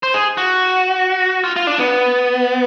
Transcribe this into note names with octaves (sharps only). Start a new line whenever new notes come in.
C5
G#4
F#4
F4
F4
D4
B3